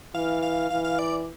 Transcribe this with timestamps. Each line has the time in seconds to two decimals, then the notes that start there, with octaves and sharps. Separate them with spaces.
0.14 E3 F5
0.42 F5
0.70 E3 F5
0.85 F5
0.99 D5